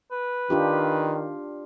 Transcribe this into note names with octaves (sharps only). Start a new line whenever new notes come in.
B4
D#3 D4 F4 G4